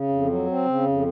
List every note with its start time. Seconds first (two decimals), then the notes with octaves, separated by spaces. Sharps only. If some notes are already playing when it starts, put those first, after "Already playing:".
Already playing: C#3
0.09 F2
0.28 F#3
0.47 C4
0.66 C#3
0.85 F2